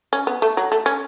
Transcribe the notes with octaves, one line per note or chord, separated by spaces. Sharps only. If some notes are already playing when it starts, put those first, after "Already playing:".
C#4
B3
A3
F#3
A3
C#4